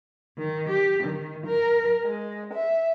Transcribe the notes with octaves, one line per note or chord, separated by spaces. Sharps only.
D#3
G4
D#3
A#4
G#3
E5